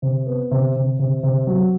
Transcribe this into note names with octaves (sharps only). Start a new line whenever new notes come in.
C3
B3
C3
C3
C3
C3
F#3